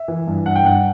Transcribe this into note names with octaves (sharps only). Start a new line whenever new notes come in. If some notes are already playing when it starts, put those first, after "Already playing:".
Already playing: E5
E3
G2
G2 F#5
G5
G2 F#5